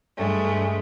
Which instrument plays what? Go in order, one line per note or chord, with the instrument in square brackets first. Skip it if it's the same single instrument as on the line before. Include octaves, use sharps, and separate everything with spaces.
[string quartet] G2 G#3 A3